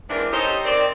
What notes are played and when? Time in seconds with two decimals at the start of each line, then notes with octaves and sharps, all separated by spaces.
0.10 G#2 E3 C4 D4 A#4
0.32 D#4 G4 A4 C5 C#5 D#5
0.65 D#3 C4 D5